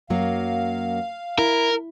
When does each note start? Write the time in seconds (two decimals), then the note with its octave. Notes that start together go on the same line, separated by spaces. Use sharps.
0.10 F#2 F#3 A#3 F5
1.39 E4 A#4